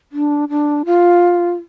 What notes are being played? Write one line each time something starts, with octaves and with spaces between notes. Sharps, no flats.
D4
D4
F4